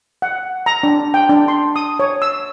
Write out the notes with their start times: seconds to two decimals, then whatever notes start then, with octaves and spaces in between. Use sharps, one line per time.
0.22 F#5
0.66 A#5
0.83 D4
1.14 G5
1.29 D4
1.48 C6
1.76 D#6
2.00 C#5
2.22 E6